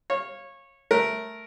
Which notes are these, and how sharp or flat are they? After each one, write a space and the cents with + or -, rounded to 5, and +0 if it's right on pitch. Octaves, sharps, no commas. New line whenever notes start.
C#5 -20 F5 +0
A3 -5 A#4 +0